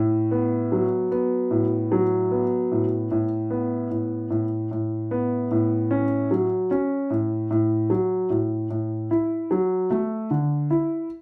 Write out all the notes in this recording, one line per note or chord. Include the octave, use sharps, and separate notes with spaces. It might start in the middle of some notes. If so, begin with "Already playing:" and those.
Already playing: A2
B3
F#3
B3
A2
F#3
B3
A2
A2
B3
A2
A2
A2
B3
A2
C#4
F#3
C#4
A2
A2
F#3
A2
A2
E4
F#3
A3
D3
E4